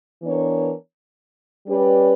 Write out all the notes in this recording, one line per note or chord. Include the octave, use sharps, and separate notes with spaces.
E3 B3 D4 A#4 C#5
G3 C#4 G4 B4 D5